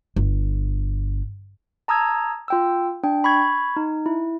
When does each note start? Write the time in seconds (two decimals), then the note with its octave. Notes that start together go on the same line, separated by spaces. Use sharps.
0.16 G1
1.88 A5 A#5 D#6 E6 G#6
2.48 F4 G5 E6
3.03 D4 G5
3.24 B5 C#6 G#6
3.76 D#4
4.06 E4